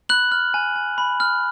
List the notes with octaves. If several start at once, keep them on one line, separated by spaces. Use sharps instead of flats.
B5 F#6 F#7
F6
G#5
G#5
B5
F6